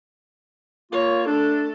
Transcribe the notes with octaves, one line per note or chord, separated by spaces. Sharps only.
A#3 F4 C#5
A3 D4 A4